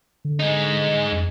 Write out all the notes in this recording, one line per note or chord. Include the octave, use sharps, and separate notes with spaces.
D3
G#3 D#4
F2